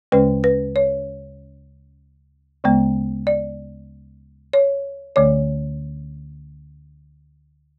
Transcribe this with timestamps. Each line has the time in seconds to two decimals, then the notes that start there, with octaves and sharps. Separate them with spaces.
0.12 D2 C#3 G#3 C#4 B4
0.44 B4
0.76 C#5
2.64 D2 C#3 G#3 B3
3.27 D5
4.53 C#5
5.16 D2 D3 A3 C#5